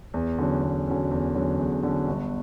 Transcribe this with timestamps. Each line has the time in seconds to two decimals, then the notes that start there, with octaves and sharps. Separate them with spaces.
0.14 E2
0.38 D3 F#3 C#4
0.62 E2
0.87 D3 F#3 C#4
1.11 E2
1.35 D3 F#3 C#4
1.59 E2
1.83 D3 F#3 C#4
2.07 G1